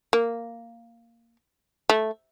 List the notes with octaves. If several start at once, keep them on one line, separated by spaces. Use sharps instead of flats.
A#3
A3